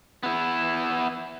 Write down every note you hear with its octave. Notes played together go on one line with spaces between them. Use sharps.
B3 E4